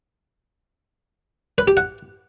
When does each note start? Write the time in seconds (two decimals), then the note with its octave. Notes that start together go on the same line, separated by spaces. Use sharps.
1.58 B4
1.68 G4
1.77 F#5